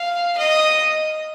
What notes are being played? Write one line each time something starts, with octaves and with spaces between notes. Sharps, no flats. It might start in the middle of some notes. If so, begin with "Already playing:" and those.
Already playing: F5
D#5